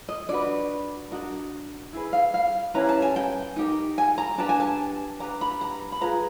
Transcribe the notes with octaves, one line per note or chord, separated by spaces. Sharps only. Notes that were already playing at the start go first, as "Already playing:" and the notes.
D#5
D4 F#4 B4 D5
D4 F#4 A#4 D#5
E4 G#4 B4
F5
F5
C#4 E4 G4 B4 A#5
A5
G#5
G5
D#4 G4 A#4
G#5
A#5
D4 G4 B4 A5
G#5
A5
D4 G4 B4 A#5
B5
A#5
B5
F4 G#4 B4 A#5